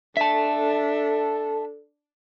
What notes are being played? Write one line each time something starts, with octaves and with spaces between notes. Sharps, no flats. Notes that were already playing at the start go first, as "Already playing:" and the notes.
D4 A4 E5 A5